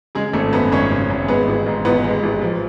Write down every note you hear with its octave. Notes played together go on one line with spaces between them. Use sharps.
C#3 G#3 G#4
G#1 A3 A4
F#2 B3 B4
G#1 C#4 C#5
C#3
G#1
G#3 B3 B4
A1
G#2
A1 B3 B4
G#3
A1
F3